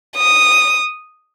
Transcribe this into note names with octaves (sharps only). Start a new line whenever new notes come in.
D#6